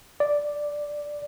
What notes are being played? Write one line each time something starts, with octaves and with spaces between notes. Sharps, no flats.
D5